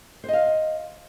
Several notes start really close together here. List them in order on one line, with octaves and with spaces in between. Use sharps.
C5 D#5 F5